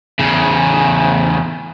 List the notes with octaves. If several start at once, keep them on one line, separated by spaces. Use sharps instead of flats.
E2 C#3